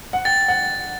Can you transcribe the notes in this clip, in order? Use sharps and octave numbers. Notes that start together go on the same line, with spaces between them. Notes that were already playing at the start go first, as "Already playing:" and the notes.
F#5
G5 A6
F#5